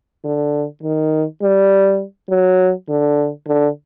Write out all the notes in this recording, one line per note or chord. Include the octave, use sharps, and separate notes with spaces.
D3
D#3
G3
F#3
D3
D3